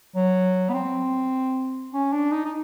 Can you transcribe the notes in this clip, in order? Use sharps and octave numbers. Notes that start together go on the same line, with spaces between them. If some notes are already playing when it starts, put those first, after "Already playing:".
F#3
B3
C4
C#4
D4
D#4
D#4